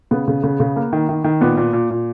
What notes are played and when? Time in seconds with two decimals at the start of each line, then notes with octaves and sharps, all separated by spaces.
0.11 C#3 B3
0.28 C#3
0.44 C#3
0.60 C#3
0.76 A#3
0.93 D#3
1.09 D#3
1.24 D#3
1.41 A#2 B3
1.57 A#2
1.73 A#2
1.90 A#2